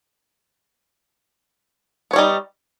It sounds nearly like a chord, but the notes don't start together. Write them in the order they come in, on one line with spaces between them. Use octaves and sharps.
B3 C#5 G3 D#4